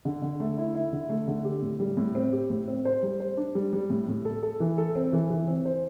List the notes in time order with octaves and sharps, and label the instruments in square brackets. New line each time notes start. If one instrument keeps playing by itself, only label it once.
[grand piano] D3
D3
A3
E4
E4
D3
A3
D3
G4
A2
G3
A2
C4
G4
A2
C4
C5
G3
C5
D4
G3
G3
A2
A2
A4
A4
E3
A4
C4
E3
E3
C4
C5